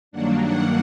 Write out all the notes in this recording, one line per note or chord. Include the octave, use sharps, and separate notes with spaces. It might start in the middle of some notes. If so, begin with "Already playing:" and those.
G2 D#3 F#3 A#3 D4 F#5
F#5